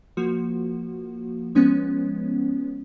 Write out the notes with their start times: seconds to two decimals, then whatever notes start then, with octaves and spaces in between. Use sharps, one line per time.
0.17 F3 A#3 F#4
1.55 F3 G#3 B3 C#4